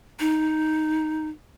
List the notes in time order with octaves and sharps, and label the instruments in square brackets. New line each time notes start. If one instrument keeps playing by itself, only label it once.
[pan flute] D#4